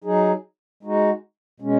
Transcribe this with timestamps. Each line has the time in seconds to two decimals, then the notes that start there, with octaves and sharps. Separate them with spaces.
0.04 F#3 D#4 G#4
0.83 G#3 D#4 F#4
1.60 B2 G#3 C#4